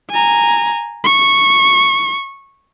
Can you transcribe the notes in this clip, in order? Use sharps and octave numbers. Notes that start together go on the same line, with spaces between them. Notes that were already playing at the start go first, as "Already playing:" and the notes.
G#5 A#5
C#6